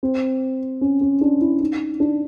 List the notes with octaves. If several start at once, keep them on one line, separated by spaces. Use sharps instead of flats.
C4
C#4
C#4
D4
E4
D#4
D4